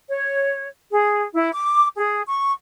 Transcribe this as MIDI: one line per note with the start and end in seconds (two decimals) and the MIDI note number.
0.08 0.67 73
0.90 1.23 68
1.33 1.50 64
1.53 1.86 86
1.95 2.21 68
2.27 2.50 85